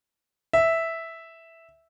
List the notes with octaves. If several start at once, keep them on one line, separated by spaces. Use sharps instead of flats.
E5